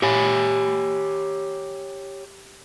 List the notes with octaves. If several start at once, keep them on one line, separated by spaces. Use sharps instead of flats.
G4 C#5 G#5